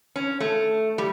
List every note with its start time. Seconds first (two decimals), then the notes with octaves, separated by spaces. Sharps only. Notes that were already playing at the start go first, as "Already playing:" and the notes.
0.16 C#4
0.40 A3
0.98 G3